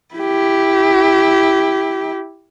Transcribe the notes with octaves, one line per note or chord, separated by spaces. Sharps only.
E4 G4